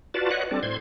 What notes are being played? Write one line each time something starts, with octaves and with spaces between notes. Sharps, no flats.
F4 F#4 B4 D5 A5
B4 C#5 D#5 F#5 F#6
G3 C4 D4 A4 D5
A2 C5 C6 G#6